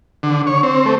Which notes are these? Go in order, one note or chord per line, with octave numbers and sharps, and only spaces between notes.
D3
C#5
C4
A3